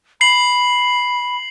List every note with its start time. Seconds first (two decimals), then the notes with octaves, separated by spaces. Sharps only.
0.21 B5 C7 F#7